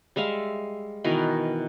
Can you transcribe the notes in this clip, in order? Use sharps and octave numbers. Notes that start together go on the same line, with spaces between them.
G3 G#3 E5 F5
B2 D#3 E3 A#4